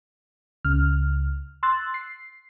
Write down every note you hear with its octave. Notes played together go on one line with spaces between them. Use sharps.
C#2 C#3 F6
C6 E6 F#6 A6
C7